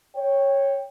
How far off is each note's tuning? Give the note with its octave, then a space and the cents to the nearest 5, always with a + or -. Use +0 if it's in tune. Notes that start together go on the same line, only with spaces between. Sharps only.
C#5 -5 G5 +10